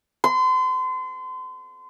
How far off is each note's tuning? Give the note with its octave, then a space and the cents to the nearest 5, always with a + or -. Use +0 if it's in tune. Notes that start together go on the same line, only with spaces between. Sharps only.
C6 -35